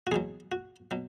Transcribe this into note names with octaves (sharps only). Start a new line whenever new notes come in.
F#4
E2 B2 F#3 G#4
F#4
B2 F#3